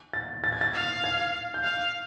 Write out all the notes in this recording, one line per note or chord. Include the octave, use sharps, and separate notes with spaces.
A6
A6
G#6
A6
F5
G#6
G6
F5 F#6